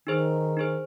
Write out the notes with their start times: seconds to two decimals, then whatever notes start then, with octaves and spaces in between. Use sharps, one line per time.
0.07 D#3 D#4 G#4 C5
0.57 D#4 G#4 C5